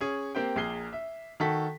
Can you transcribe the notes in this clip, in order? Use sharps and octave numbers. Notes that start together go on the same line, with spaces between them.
C#4 G#4
A#3 C4 G4 G5
A#1 A#3 G#4 C7 G7
E5
D#3 F#4 A4 B6